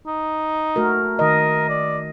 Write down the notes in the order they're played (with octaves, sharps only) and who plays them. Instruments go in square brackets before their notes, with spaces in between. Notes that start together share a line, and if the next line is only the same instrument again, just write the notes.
[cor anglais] D#4
[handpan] A3 F#4 A#4
[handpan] D#3 D#5 [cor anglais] A#4
[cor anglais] D5